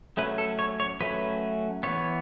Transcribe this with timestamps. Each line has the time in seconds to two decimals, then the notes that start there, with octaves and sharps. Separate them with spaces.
0.17 F#3 A3 C#4 B4
0.38 A4
0.59 C#5
0.80 C#5
1.00 F#3 A3 C#4 B4
1.83 E3 B3 C#5